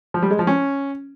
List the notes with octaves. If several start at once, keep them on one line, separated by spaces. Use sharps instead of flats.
F3
G3
G#3
F3
C#4